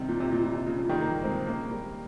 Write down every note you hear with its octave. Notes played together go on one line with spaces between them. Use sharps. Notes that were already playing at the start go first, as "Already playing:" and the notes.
Already playing: C3 D#3 G3
A#2
C3
A#2
A#2
C3
A#2 C#3
C#3 F3
D#3 G3
G3 A#3
G#3 C4
A#3 C#4
G3 A#3